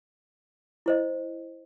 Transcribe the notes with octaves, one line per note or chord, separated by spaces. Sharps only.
E4 C5 D#5